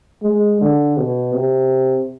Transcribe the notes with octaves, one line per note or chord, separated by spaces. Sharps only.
G#3
D3
B2
C3